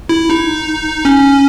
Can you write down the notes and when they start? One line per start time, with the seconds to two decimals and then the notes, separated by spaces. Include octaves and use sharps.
0.09 E4
0.29 D#4
1.05 C#4